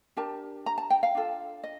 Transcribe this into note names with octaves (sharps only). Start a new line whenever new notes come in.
D4 G4 A#4 A5
A#5
A5
G5
F5
D4 F4 A4
D#5